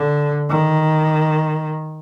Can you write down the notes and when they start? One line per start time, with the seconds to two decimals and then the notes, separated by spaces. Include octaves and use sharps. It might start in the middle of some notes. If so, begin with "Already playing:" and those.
Already playing: D3
0.50 D#3